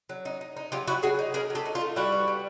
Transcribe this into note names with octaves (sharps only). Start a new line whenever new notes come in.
F#3
D#4
D#4
D#4
F#3 F4 G4
D#4 E4 F#4
F#3 F#4 G#4
D#4
D#4 G#4 A#4
F#3
G4 A4
D#4
F4
A3
G3 E4 F#4
B3
G3